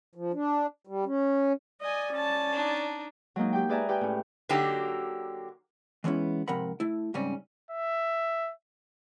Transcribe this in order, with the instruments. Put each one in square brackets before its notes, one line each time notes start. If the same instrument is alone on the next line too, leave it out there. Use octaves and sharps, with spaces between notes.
[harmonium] F3
D4
G3
C#4
[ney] D5 [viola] D#5 G#5
[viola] C#4 A5
[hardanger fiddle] D4 D#4
[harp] F#3 G#3 A#3 D#4
G4 G5
G#4 B4 D5 E5 G#5 A#5
G4 B4 G5 G#5
A2 C#4
[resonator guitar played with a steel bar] D3 F#3 A#3 D#4 F#4 G4
[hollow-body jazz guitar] E3 G#3 B3 C#4 E4
G#2 C3 F3 A#4 F#5 B5
A3 E4
G#2 C#3 G3 C4 C#4
[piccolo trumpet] E5